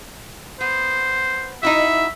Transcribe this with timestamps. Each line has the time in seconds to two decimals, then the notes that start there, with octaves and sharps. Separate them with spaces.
0.61 B3 C5
1.63 D#4 E4 F#4 E5